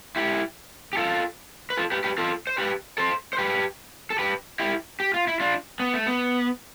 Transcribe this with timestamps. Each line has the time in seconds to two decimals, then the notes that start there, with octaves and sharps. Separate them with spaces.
0.16 E4 G4
0.93 G4
0.97 F4 A4
1.70 B4
1.77 F4 A4
1.91 G4 B4
2.04 G4 B4
2.18 F4 A4
2.47 C5
2.58 G4 B4
2.98 A4 C5
3.33 C5
3.39 G4 B4
4.10 A4
4.19 G4 B4
4.59 E4 G4
5.00 G4
5.14 F4
5.27 E4
5.40 D4 F4
5.80 B3
5.93 A3
6.06 B3